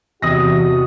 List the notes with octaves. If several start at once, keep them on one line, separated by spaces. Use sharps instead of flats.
E2 C3 F#4 D#5 D#6 A#6